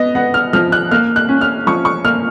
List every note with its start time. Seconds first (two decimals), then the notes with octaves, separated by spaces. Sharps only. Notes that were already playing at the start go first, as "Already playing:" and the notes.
Already playing: B3 D#5
0.15 B3 F#5
0.34 F6
0.53 F3 F6
0.72 F#6
0.91 A#3 F6
1.16 F#6
1.29 C#4
1.41 F6
1.67 F3 C#6
1.85 C#6
2.04 A#3 F6